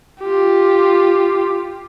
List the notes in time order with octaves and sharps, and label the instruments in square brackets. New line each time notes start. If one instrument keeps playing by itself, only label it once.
[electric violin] F4 G4